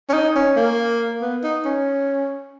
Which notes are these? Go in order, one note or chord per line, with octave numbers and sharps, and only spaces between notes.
C#4
D#4
C#4
A#3
B3
D#4
C#4